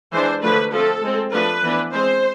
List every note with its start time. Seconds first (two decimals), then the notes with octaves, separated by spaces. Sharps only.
0.12 E3 G#3 D4 C5
0.42 D3 F3 A3 D4 B4
0.72 F3 A3 C4 A4
1.03 G#3 C4
1.32 F3 A3 D4 B4
1.63 E3 B3 D4
1.93 G#3 C4 C5